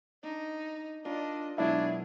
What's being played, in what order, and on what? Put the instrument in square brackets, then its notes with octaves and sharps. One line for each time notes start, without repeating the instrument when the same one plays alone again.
[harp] D4 [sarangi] D#4
[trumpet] D4 [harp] F4 A#4 [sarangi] D#5
[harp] B2 F#3 G#3 [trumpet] D4 [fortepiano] E4 [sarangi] G#4